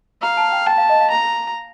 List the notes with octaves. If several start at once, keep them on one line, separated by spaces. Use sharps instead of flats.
F5 A#5
A5
G5
G5 A5
F5
D#5
F5
A#5